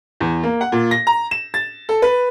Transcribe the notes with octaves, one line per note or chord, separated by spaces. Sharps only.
E2
A#3
F#5
A#2
A#6
A#5
E7
A6
A4
B4